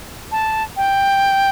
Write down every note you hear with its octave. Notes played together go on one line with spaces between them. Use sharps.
A5
G5